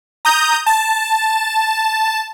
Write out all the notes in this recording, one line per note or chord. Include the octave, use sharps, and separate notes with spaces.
A#5 D#6 G6
A5